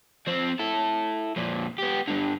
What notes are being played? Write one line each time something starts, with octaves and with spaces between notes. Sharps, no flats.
F3 C4
E4 A4
F2 A#2
B3 G4
G2 D3